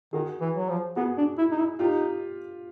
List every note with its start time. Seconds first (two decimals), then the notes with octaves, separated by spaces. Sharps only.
0.13 D#3 F#4 G#4
0.41 E3
0.57 F#3
0.69 F3
0.96 B3 F#4 G#4
1.18 D4
1.38 E4
1.52 D#4
1.59 E4
1.79 D#4 F4 G4